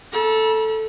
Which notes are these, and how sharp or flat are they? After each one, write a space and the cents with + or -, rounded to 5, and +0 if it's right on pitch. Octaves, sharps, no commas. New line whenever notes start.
A4 +0 B5 -45